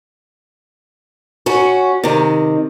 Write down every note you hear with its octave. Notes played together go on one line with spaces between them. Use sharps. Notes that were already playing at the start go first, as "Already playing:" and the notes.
C#4 F#4
C3 D#3